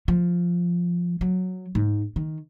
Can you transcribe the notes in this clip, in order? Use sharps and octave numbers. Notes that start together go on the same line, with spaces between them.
F3
F#3
G#2
D#3